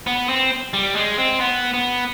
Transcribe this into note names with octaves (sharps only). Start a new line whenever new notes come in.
B3
C4
G3
G#3
C4
B3
B3